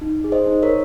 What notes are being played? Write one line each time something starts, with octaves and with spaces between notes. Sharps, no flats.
D#4
G#4
C5 D#5
D#4
A#4 C#5